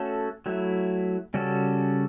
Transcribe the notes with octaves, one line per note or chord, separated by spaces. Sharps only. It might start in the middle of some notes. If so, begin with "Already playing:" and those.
Already playing: A3 C#4 F#4 A4 C#5
F#3 A3 E4
C#3 G3 C#4 F#4 A4